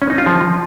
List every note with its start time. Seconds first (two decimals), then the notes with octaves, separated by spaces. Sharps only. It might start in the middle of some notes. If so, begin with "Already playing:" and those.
0.02 C#4
0.10 D#4
0.18 F4
0.26 F3